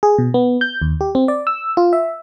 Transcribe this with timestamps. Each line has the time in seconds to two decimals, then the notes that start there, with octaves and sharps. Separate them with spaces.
0.03 G#4
0.18 B2
0.34 B3
0.61 G6
0.82 D#2
1.01 G4
1.15 C4
1.28 D5
1.47 E6
1.77 F4
1.93 E5